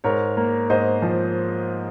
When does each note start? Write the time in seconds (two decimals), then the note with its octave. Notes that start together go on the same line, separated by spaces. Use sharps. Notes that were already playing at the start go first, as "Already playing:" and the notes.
0.04 G#2 A#4 C#5
0.37 A#3
0.70 G#2 C5 D#5
1.02 F3